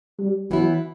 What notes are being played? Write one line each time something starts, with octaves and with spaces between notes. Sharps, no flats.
G3
E3 F#3 B3 E4